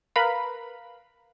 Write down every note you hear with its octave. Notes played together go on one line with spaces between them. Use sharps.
A#4 B4 F5 B5